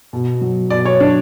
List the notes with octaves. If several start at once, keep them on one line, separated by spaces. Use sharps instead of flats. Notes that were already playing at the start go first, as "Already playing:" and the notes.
B2
F#3
B2 D5
C#5
F#3 D4